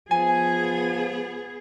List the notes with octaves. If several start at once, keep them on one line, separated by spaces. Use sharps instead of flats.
F3 B3 G#4 G#5